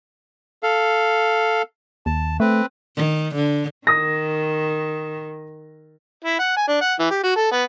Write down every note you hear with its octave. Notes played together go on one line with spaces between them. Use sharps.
A4 F5
D#2 A5
A3 C4 B4
D#3
D3
D#3 D#6 A#6
E4
F#5
G#5
D4
F#5
E3
G4
F#4
A4
B3